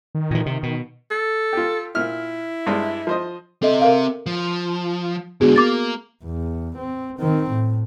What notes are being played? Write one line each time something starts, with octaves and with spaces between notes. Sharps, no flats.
D#3
A#2 E3
C3
B2
A4
F4 G4
A#2 E4 F6
G2 G#3 D5
F3 C5 D#5
C4 A4 D#5 E5
A#4 F5
F3
G#2 D3 B3 F#4 G#4
A#3 D6 A6
E2
C4
D#3 C4
A2